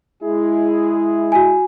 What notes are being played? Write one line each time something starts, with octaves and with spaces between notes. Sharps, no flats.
G#3 E4 G#4
F#4 G#5